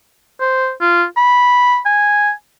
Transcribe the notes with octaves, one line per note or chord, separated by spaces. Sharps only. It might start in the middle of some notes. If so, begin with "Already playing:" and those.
C5
F4
B5
G#5